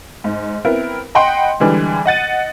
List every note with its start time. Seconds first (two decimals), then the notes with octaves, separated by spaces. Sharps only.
0.24 G#2
0.65 B3 C4 E4 A#4
1.15 D#5 F#5 G5 B5 C6
1.60 D3 E3 G3 G#3
2.06 D#5 F#5 A6 D#7